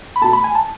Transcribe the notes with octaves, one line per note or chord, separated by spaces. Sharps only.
B5
B2 A3 A5
B5
G#5
A5